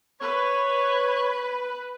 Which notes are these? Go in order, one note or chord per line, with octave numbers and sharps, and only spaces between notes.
B4 C#5